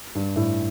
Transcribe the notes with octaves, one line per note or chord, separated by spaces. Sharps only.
G2
A2